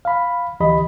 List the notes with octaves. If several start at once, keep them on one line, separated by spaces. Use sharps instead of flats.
F5 B5
D2 E3 G4 D#5 B5